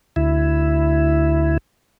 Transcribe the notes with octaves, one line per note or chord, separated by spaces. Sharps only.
D2 E4